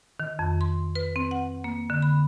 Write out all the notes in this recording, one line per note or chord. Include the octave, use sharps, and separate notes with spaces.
D#3
F2
C6
B4
C4
F#5
A#3
D3
B5